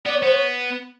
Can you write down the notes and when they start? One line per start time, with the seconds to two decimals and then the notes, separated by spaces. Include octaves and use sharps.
0.06 B3 D5
0.15 C#5
0.23 B3 C5
0.32 C#5